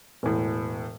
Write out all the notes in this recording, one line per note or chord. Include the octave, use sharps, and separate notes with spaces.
E1 A2